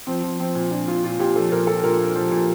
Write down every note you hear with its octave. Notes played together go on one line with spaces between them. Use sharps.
F3 C4
F3
F3 C4
A#2
A#2 D4
A#2 F4
A#2 F4
A#2 G4
F3 A4
A#2 A#4
F3 A4
A#2 A#4
A#2
F3
A#2